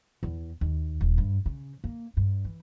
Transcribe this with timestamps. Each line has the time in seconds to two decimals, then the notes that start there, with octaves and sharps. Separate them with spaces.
0.23 E2
0.61 D#2
1.01 D#1
1.18 G2
1.46 C#3
1.84 A#3
2.17 G2
2.45 E3